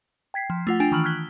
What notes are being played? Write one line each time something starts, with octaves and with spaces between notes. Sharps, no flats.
G5 G#6 B6 C7
F3
A3 F4 F#5
D4 F4 G5 G#5
D#3 E3 C#6 E6 F6 F#7
F6 F#6 G#6 B6 G7